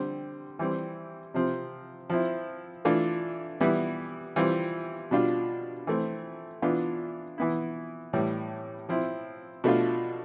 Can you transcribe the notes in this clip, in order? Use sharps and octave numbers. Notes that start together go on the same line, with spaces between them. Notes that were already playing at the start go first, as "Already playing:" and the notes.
Already playing: D3 G3 C4
E3 G3 C4
C3 F3 C4
F3 C4 E4
E3 A3 D4 F4
E3 G3 B3 E4
E3 G3 C4 F4
B2 G3 D4 F4
E3 A3 C4
E3 B3 D4 F4
E3 B3 E4
A2 E3 G3
F3 C4 E4
B2 A3 D4 F4